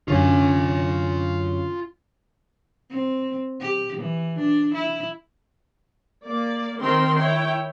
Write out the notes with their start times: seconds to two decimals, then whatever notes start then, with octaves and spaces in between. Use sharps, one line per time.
0.08 F#2 D3 C#4 F4 G#5 C#6
2.90 C4
3.60 G4
3.97 E3
4.39 D4
4.74 E4
6.25 A#3 D5
6.79 D#3 C4 A#4 G5 C6
7.15 E4 C#5 G5